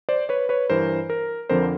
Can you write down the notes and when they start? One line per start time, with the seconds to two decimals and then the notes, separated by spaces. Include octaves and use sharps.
0.09 C5 D5
0.29 B4 C#5
0.49 B4 C#5
0.70 G2 E3 A#4 C5
1.10 A#4
1.49 F2 D3 F3 A#4 C5